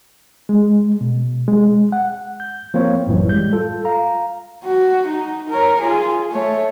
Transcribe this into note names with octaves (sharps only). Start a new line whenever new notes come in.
G#3
B2
G#3
F#5
G6
F3 A#3 C4 F4 C#5
G#1 F#2 A2 E3 F#3
G3 G#3 G6
F4 A4
F5 A#5
F#4
D#4
A#4 C#5
F4 G#4
A3 C#5